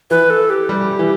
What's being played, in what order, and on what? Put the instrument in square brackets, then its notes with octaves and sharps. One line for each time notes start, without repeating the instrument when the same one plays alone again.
[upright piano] E3 [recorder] B4
[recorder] A4
G4
[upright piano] G3
E3